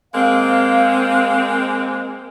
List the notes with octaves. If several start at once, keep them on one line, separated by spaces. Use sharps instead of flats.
G#3 A#3 C4 F5